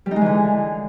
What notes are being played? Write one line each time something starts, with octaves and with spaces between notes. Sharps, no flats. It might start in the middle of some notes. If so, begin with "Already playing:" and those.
G3
D#4
G#3
E3
D3